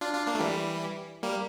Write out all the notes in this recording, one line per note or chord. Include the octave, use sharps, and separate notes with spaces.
D4 F4
D4 F4
A#3 D4
A3
E3 G3
G3 A#3